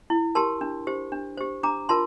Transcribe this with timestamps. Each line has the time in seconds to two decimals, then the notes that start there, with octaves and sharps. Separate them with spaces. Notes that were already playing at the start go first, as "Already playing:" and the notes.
0.10 E4
0.35 G4 A#4 A5 C6
0.61 D4
0.87 G4 C5
1.12 D4
1.38 G4 C5
1.63 D4 A#5 D6
1.89 F4 A#4 A5 C6